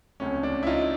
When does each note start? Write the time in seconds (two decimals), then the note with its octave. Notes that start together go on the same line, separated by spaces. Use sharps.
0.20 C#2 C3 F3 A3 C#4
0.43 D4
0.63 E4
0.67 D#4 F4